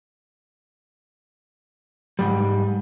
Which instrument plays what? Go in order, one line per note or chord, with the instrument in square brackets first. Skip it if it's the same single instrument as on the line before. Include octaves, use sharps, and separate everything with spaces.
[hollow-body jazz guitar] G#2 G3